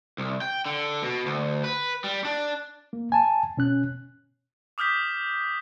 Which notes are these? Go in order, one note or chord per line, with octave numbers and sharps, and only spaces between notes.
C2
G5
D3
B2
D2
B4
G3
D4
A#3
G#5 A5
B2 C#4 F#6
D6 D#6 F6 G6 B6